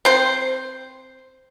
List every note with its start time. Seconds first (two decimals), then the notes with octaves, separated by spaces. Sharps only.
0.05 C4 C5